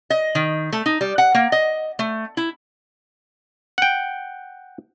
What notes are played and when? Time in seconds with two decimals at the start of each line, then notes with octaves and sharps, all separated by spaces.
0.10 D#5
0.35 D#3
0.73 A3
0.86 D#4
1.01 G3
1.18 F#5
1.35 A#3
1.52 D#5
1.99 A3
2.37 E4
3.78 F#5 G5